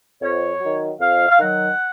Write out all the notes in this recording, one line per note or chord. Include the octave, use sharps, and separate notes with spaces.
F2 C#5
D#3 F#3
F2 F5
F5
D#3 F#3 F#5